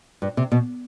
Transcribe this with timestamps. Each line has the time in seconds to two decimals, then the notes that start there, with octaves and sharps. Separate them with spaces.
0.22 G2
0.37 C3
0.52 B2